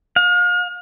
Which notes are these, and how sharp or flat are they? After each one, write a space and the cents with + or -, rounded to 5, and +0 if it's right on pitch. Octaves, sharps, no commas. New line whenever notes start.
F5 +40